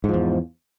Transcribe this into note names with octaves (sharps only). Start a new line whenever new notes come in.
E2 G#2 F3